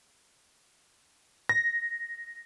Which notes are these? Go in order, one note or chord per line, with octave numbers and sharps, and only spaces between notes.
A#6